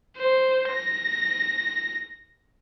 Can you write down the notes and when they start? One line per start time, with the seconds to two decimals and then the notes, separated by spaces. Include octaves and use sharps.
0.17 C5
0.69 A#6